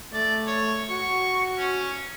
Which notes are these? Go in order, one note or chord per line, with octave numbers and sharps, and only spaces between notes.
A3 D5
C#5
F#4 C#6
C#4